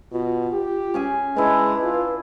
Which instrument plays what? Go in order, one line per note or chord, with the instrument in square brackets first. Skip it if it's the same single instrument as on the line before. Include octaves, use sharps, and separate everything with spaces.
[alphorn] B2 [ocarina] F4
[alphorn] G4
[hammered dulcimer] C#4 G#4 G#5
[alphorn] G#3 [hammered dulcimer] D4 E4 [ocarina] B4
[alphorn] F4